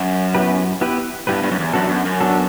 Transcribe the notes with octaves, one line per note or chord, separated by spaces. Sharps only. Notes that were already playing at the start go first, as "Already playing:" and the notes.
Already playing: F#2
B3 E4 G4 B4
B3 E4 G4 B4
G2 B3 E4 G4 B4
G2
F#2
E2
F#2 B3 D4 F#4 A4
F#2
F#2
B3 D4 F#4 A4